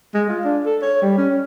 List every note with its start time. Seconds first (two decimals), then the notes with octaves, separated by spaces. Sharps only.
0.14 G#3
0.29 F4
0.44 D4
0.66 A4
0.82 C#5
1.02 G3
1.18 C#4